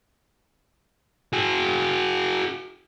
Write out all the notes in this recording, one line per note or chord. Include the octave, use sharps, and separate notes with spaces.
F#4 G#4